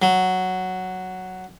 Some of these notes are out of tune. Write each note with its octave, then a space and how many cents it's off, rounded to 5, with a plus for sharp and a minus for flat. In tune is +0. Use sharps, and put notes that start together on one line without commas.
F#3 +0